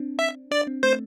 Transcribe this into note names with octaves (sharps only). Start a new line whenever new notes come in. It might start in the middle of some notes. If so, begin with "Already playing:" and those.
Already playing: C4 D4
E5
D4 D5
C4
A3 C5